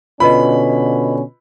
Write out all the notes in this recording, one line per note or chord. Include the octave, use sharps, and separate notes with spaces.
B2 D3 C#4 F4 B4 D#5 B5